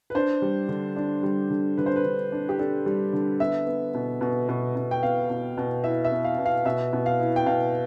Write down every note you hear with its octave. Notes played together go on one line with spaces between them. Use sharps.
B4
D4 C5
G3
D3
D4
G3
D3
D3 B4
C5
B4
D3
D4
G4
D4 A4
G3
D3
B3 E5
B3
B2
B2
B2
B2
G5
B3 F5
B2
B2
E4 E5
E5
B3
F5
B2
F5
B2 E5
B2
F5
E4
G5
B2 F5